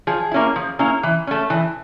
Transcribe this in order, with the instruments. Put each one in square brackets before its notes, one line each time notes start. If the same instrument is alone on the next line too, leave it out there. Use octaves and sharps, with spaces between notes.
[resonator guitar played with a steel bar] F3 G#4
A#3 C#4 E4
F3
A#3 C#4 E4
E3
A3 C#4
E3